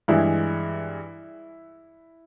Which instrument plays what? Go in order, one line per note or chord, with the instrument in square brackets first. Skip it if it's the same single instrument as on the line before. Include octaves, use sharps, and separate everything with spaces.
[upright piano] G2 E3 G#3 E4